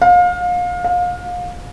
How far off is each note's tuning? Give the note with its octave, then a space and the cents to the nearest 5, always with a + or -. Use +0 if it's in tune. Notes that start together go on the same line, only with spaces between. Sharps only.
F5 +30
F5 +30